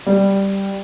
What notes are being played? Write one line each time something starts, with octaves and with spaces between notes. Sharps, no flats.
G3